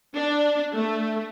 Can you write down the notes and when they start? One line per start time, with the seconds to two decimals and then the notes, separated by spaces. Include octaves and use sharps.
0.16 D4
0.74 A3